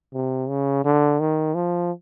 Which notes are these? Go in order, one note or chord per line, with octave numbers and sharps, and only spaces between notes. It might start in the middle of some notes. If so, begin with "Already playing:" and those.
C3
C#3
D3
D#3
F3